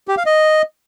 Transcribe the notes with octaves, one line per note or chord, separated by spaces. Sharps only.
G4
F5
D#5